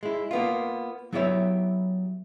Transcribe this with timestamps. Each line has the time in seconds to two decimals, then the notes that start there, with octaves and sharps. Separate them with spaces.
0.03 G#3 E4
0.31 A#3 B3 F4
1.13 F#3 B3 E4 G4 C#5 E5